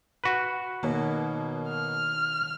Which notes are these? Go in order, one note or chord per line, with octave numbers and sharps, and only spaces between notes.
F#4 B4
B2 D#3 A#3 C#5
F6